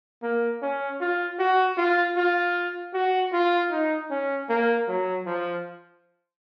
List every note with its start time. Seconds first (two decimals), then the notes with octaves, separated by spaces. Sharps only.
0.23 A#3
0.62 C#4
1.00 F4
1.39 F#4
1.77 F4
2.17 F4
2.94 F#4
3.33 F4
3.71 D#4
4.10 C#4
4.49 A#3
4.88 F#3
5.26 F3